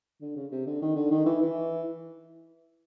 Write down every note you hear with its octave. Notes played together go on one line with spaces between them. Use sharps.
D3
C#3
C3
D3
D#3
D3
D#3
E3
E3